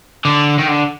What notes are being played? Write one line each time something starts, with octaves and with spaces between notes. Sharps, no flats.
D3
D#3
D3